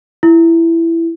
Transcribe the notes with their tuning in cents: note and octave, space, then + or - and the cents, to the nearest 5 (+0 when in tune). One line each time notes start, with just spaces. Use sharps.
E4 +10